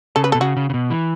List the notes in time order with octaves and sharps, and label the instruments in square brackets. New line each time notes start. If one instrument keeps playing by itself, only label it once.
[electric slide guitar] C#3 [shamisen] A4
[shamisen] B4
[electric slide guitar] B2 [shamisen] A4
[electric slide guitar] C#3 [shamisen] F#4
[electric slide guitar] C#3
C#3
B2
E3